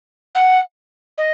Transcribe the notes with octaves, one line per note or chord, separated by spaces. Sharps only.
F#5
D#5